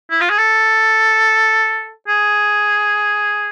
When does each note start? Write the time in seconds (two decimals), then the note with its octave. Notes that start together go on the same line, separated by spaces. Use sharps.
0.11 E4
0.21 F4
0.30 G#4
0.38 A4
2.08 G#4